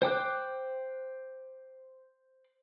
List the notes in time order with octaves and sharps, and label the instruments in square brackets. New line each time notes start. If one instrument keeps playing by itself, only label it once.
[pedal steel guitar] C5 G5 D6 F#6